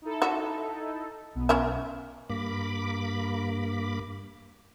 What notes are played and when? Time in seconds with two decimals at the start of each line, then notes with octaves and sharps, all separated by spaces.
0.02 D#4 E4 A4
0.22 F#4 E5
1.35 B1 B3
1.49 C#4 A#4 E5
2.29 G2 A#3 B5 D6